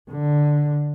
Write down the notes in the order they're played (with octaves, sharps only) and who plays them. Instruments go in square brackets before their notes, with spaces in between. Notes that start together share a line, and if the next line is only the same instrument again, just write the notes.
[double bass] D3